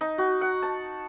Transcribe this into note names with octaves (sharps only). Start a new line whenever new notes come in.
D#4
F#4
F#5
A5